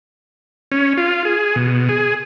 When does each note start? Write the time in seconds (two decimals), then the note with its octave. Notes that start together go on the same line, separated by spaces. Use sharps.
0.72 C#4
0.97 F4
1.25 G#4
1.56 B2
1.89 G#4